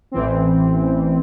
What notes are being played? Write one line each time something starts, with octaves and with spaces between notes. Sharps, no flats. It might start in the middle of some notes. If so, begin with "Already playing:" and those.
A1 E3 C4